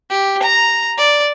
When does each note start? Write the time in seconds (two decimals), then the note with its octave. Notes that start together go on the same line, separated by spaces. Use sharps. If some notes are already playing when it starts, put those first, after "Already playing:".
0.10 G4
0.43 A#5
0.98 D5